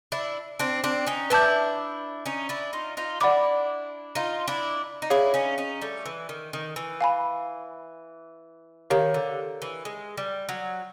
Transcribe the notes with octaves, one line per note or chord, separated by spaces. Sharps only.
D4 E4
C4 D4
C4 D4
C#4 D#4
D4 E4 B4 E5 A5 D6 G6
C#4 D#4
D4 E4
D#4 F4
D#4 F4
D4 E4 D5 F#5 B5 D6
D#4 F4
D4 E4
D#4
D4 E4 G#4 C#5 F5
C#4 D#4
C#4 D#4
G3 A3
E3
D#3
D#3
E3
F5 G#5 B5
D#3 G4 A#4 C#5 F5
D3
E3
G#3
G3
F#3